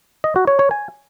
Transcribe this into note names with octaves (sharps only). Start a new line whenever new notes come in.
D#5
F#4
C#5
C#5
G#5